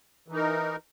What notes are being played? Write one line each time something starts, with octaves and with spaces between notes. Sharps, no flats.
E3 D#4 A#4